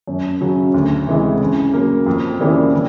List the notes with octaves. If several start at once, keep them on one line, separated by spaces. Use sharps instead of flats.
F#2
C#3 F#3
D2
C3 E3 G#3
C#3
F#3 A#3
F2
C#3 E3 G3 A#3
C#3